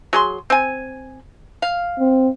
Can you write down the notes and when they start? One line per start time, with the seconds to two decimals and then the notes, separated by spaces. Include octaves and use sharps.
0.13 F#3 G#4 C6
0.50 C4 G#5
1.62 F5
1.99 C4